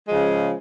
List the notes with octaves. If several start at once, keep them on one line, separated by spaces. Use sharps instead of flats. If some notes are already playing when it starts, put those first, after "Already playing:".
C#3 F3 G#3